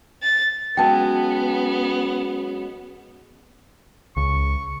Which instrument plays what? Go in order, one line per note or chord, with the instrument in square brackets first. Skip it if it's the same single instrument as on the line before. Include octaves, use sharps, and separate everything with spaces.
[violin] A6
[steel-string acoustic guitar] F#3 G#3 [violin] B3 [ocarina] C#4 [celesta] G5 A5
[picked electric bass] C#2 [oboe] C#6